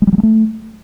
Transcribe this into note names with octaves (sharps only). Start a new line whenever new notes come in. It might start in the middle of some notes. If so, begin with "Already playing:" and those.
G#3
G3
F#3
G#3
A3